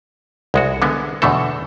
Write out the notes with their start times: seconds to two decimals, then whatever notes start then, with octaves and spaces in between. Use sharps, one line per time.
0.54 C2 G#3 F#4
0.82 D3 G#3 B3
1.22 E2 B2 D3 A3 A4